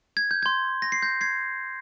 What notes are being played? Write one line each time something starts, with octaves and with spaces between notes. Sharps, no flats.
G#6
G6
C6 G6 G#6
A#6
C7
G6 A#6
G#6 C7